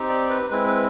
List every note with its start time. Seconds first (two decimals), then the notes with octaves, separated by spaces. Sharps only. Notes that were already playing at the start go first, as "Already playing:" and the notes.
Already playing: C4 D#4 G4
0.09 D5
0.29 B4
0.51 G#3 C4 E4 B4
0.67 B4